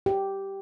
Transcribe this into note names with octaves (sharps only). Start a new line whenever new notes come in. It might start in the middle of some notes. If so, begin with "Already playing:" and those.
G4